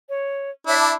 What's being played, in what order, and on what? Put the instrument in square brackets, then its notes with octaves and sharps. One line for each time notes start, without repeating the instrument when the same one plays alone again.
[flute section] C#5
[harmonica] D4 E4 [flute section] C#5 E5
[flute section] E5 A5 D6